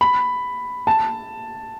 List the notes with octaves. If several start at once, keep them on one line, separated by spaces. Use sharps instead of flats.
B5
A5